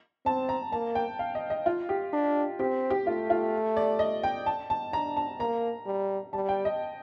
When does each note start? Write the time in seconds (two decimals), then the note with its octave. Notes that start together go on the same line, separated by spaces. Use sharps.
0.25 C4 A5
0.49 A#5
0.72 A#3 A5
0.95 G5
1.19 F5
1.35 D#5
1.50 D#5
1.66 F4
1.89 G4
2.13 D4
2.59 C4 G4
2.90 G4
3.06 A3 F4
3.30 F4
3.77 D5
3.99 D#5
4.23 G5
4.46 A5
4.70 A5
4.93 D4 A#5
5.17 A5
5.40 A#3 A#5
5.86 G3
6.33 G3 A5
6.49 G5
6.65 D#5